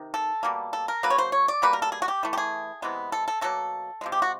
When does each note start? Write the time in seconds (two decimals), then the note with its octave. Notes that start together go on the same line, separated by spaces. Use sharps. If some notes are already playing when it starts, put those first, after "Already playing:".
Already playing: C3 D#3
0.14 A4
0.43 B2 G3 A#3
0.73 A4
0.88 A#4
1.03 C#3 F#3 A#3 B4
1.10 C#5
1.18 C5
1.32 C#5
1.48 D5
1.62 B2 G3 A#3 B4
1.73 A#4
1.82 A4
1.92 G#4
2.02 F#4
2.08 G4
2.23 E3 A3
2.33 G4
2.38 G#4
2.82 C3 E3 G#3 B3
3.12 A4
3.28 A4
3.41 B2 F#3 A#3 A4
4.01 C3 F3 G#3
4.12 G4
4.22 F#4